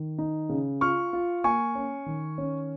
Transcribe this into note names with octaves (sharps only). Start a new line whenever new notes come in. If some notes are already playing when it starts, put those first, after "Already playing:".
Already playing: D#3
D#4
C#3
F4 C#6 F6
F4
A#3 G#5 C#6
C#4
D#3
C#4